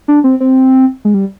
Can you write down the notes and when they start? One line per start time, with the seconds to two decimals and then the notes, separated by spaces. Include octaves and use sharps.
0.08 D4
0.24 C4
0.40 C4
1.05 G#3
1.14 G3